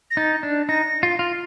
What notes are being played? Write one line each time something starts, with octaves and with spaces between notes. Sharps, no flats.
A#6
D#4 A6
D4
D#4 A#6
F4
F4